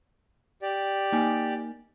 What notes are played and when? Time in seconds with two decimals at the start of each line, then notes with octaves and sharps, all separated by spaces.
0.62 G4 D5
1.12 A#3 D#4 G#5